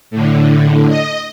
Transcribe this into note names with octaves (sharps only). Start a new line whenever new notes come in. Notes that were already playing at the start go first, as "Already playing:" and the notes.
A2 D3
D#5